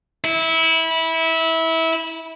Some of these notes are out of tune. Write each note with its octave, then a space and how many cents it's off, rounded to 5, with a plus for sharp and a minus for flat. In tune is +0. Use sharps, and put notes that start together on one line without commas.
E4 -20